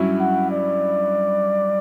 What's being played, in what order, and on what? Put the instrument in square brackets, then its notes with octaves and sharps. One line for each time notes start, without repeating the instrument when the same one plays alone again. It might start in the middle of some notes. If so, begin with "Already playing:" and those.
Already playing: [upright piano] G2 F#3 C#4 E4
[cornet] F#5
D5